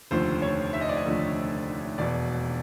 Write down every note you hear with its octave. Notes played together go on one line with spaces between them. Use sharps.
F1 D#2 D3 F3 A3 C5
C#5
E5
D#5
D5
D#5
F1 D#2 D3 F3 A3
E1 E2 B2 D5